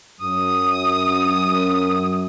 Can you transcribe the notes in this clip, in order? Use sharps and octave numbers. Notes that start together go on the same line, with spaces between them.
F#2 D#6